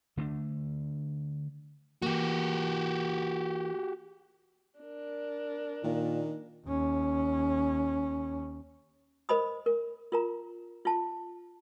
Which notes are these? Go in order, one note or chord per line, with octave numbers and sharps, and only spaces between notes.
D3 A3 A#3 D4
E3 A#3 F#4 G4
D4 A#4
A#2 D#3
D#2 C#4
A#4 C5 D#5 B5 D#6
A#4
F4 A#4 A#5
F4 A5